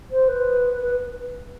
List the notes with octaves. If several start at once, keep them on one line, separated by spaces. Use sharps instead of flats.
C5
B4
B4